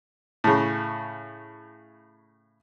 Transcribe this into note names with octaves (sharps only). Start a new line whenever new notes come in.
A2 C#3